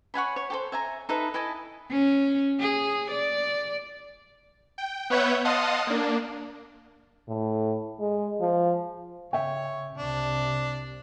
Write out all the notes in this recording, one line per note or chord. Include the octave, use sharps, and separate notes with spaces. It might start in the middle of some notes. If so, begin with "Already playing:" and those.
C#5 F#5 G#5 B5
C#5
G4 A4 C5
E5 G#5 A#5
D#4 A4 B4 E5
E4 D#5 G#5 A5
C#4
G#4
D5
G5
B3 B4 C#5 E5 F#5 G6
D#5 F5 F#5 A5 C6 D#6
A#3 D4
A2
G#3
F3
C#3 C#5 E5 G5
C2 C3 D4